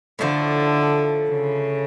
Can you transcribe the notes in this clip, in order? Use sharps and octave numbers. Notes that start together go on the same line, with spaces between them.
A2 D3 F3 A3
C#3